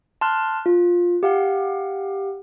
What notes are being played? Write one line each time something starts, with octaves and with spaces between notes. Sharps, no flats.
A5 C6 F6 F#6
F4
G4 F5 F#5